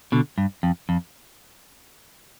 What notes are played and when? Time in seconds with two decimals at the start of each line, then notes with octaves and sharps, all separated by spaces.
0.12 B2 D3
0.38 G2
0.63 F2
0.89 F2